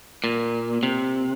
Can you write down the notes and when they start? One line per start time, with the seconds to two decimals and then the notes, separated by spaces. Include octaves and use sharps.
0.24 A#2
0.83 C3